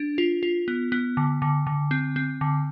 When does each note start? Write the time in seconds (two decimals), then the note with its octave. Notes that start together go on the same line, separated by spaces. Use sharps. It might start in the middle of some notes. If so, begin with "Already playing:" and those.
Already playing: D4
0.18 F4
0.43 F4
0.68 B3
0.92 B3
1.17 D3
1.42 D3
1.67 D3
1.91 C4
2.16 C4
2.41 D3